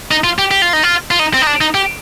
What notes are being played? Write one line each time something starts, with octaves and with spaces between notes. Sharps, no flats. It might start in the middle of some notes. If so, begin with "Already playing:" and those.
D#4
F4
G4
G4
F4
D#4
F4
F4
D#4
C4
D#4
D4
D#4
G4